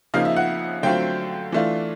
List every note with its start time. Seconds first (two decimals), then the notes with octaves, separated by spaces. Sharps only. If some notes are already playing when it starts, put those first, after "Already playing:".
0.14 C#3 F3 A#3 D#4 F5
0.25 E5
0.36 F#5
0.83 D3 F#3 A3 C4 F4 G5
1.52 E3 A3 D4 F4